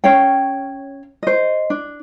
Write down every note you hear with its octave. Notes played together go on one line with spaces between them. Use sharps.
C#4 C#5 F5 G5
C5 D#5
D4